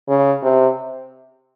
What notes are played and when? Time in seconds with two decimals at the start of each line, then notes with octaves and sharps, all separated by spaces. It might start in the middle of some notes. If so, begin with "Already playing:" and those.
0.08 C#3
0.43 C3